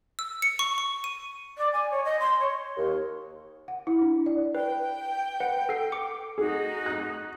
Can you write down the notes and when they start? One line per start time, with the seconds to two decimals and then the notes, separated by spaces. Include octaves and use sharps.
0.19 E6
0.42 C#7
0.59 C#6
0.78 C#6
1.04 D#7
1.57 D5
1.73 G#5
1.90 C#5
2.04 D#5
2.19 C6
2.39 C#5
2.76 D#2
3.68 F#5
3.87 E4
4.01 D4
4.26 D5
4.55 B4 G5
5.40 B4 F#5
5.69 A4 C7
5.92 D6 C#7
6.38 D#4 F#4 G#4
6.86 F#6